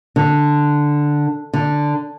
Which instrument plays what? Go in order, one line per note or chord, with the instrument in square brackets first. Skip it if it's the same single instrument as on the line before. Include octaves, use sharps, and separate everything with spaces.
[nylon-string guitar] D3
D3